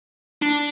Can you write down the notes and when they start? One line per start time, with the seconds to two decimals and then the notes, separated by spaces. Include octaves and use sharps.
0.42 D4